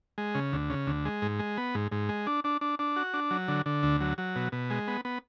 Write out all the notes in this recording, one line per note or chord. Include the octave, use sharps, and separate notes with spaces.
G#3
C#3
D2
C#3
D2
G#3
G#2
G#3
B3
G#2
G#2
G#3
D4
D4
D4
D4
F#4
D4
F#3
D3
D3
D2
F#3
F#3
B2
B2
G#3
B3
B3